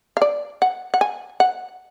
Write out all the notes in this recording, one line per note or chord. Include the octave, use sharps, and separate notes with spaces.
F5
D5
F#5
F#5
G#5
F#5